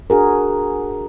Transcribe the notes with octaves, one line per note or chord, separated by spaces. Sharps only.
D4 F#4 G#4 A#4